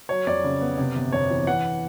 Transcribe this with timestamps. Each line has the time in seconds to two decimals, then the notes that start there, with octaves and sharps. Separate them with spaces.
0.09 F#3 C#5
0.27 F2 D5
0.44 C#3
0.61 B3
0.78 C3
0.95 G1
1.12 F2 C#5
1.30 E3
1.47 E3 F#5